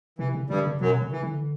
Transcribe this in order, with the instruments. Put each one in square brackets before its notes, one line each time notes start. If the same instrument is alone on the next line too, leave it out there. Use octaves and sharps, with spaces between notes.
[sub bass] C3 [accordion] E3
[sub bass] C#3
[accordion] G2 G3 [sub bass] D3
[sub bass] C#3
[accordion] F#2 F#3 [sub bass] B2
[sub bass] C#3
[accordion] E3
[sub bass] D3